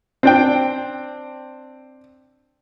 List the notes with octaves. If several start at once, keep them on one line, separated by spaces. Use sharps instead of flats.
C4 D4 G5